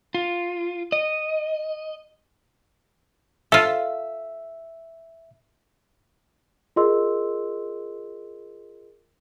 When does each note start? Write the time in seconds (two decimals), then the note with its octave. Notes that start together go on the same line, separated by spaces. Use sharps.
0.15 F4
0.92 D#5
3.52 F4 A4 E5
6.76 F4 G#4 A#4 D#5 C6 E6